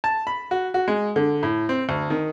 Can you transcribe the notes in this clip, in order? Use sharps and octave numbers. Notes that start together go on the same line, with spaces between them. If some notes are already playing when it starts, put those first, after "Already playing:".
A5
B5
F#4
F#4
G#3
D3
A2
C4
D2
D#3